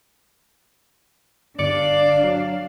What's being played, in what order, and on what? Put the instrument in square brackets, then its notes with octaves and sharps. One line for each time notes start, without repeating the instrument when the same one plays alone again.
[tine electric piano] G1 D6 C#7 [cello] D4 F5 [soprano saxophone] D5
[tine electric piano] F#3